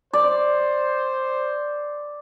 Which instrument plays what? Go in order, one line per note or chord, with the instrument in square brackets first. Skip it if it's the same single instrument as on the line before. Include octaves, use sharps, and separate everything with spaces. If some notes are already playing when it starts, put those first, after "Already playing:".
[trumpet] C5 [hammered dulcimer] D5